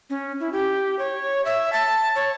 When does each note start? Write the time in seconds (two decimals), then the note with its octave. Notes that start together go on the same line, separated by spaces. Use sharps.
0.10 C#4
0.40 E4
0.52 G4
0.99 C#5
1.45 E5
1.73 A5
2.15 C#5